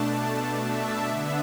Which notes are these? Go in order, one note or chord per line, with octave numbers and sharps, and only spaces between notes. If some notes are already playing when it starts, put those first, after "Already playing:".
Already playing: B2 A3 D4 A5
E5
D3 B3 D4